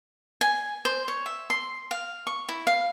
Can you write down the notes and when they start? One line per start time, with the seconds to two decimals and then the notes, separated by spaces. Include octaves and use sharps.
0.41 G#5
0.85 C5
1.08 C#5
1.26 E5
1.50 C6
1.91 F5
2.27 C#6
2.49 E4
2.67 F5